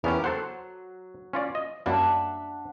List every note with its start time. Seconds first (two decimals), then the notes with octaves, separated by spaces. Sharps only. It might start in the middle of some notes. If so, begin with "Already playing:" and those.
0.04 E2 B3 C#4 G4 A#4
0.24 F#3 A4 C5 F#5
1.33 C#4 F4 D5
1.55 D#5
1.86 F#2 G3 A#3 D4 E5 F#5